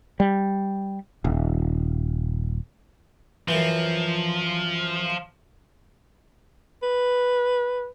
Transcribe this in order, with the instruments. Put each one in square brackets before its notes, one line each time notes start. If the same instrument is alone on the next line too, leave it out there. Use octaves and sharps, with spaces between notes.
[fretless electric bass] G3
D#1
[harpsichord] F#2 E3 [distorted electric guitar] F3
[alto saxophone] B4